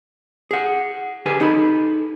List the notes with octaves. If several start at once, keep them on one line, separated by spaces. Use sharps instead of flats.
G#4 F#5
D3 G4 G#4 B4 G#5
D#4 A4 B5